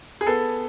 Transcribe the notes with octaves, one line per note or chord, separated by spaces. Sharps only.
G#4
B3 A4